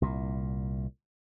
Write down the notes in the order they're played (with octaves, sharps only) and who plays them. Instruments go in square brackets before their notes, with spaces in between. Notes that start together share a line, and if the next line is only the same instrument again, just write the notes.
[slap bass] C2 A#2